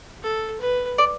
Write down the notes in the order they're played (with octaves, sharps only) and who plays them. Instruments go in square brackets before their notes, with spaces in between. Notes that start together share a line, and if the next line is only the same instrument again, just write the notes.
[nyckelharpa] A4
B4
[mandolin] D5